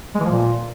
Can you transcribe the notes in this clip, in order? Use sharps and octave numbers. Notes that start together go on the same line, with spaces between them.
G#3
E3
F3
A#2